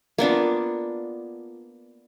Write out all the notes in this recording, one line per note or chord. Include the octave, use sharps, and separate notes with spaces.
A#3 B3 D4 F4